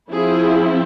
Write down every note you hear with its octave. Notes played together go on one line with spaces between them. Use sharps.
F3 C4 E4 G#4